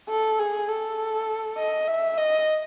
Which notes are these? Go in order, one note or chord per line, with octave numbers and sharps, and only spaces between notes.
A4
G#4
A4
D#5
E5
D#5